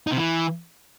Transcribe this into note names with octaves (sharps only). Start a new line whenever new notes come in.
D#4
C3
E3